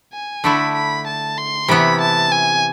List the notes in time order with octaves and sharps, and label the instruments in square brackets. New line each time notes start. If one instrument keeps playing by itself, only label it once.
[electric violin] G#5
[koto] D3 A3 E4 [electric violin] B5
[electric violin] B5
A5
C6
[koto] C3 E3 B3 E4 [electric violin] B5
[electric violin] A5
G#5